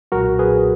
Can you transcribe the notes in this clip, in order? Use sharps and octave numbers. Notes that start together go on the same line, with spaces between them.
B1 A#2 F#3 F#4 A#4
G#4 B4